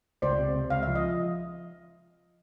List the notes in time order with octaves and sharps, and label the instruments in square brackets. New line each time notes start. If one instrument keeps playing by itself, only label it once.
[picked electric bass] C#2 [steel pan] C5 D5
[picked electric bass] C3
C3
[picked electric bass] C#2 [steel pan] F5
[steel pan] E5
[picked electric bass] F3
[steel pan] D#5